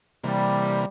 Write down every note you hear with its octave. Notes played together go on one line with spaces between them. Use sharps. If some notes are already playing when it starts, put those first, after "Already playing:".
C3 E3 G3 A#3